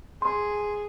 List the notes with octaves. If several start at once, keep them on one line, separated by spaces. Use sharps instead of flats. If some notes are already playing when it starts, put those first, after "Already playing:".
G#4 C6